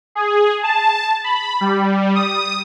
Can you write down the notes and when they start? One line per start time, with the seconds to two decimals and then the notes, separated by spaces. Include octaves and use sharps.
0.15 G#4
0.63 A5
1.24 B5
1.61 G3
2.15 D#6